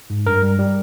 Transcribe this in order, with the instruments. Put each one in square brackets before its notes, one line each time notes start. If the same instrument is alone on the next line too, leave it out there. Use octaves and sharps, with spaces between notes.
[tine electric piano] G#2
G2 A#4
G3
G3